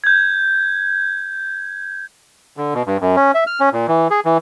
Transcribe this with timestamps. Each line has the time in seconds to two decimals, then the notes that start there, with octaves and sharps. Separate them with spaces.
0.04 G6 G#6
2.57 D3
2.74 B2
2.87 G2
3.01 F#2
3.16 C#4
3.35 E5
3.47 F6
3.60 C#4
3.73 A#2
3.88 E3
4.10 G#4
4.25 E3